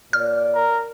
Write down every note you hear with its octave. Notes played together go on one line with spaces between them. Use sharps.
A#2 C#5 D5 F6
A#4